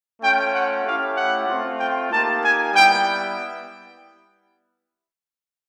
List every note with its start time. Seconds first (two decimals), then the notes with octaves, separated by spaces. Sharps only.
0.22 A3 C#4 F4 G5
0.53 F#5
0.84 A3 C#4 E4 G4 F5
1.16 F#5
1.47 A3 C4 F4
1.79 G5
2.10 A#3 D#4 G4 A5
2.41 G#5
2.73 G3 B3 E4 G5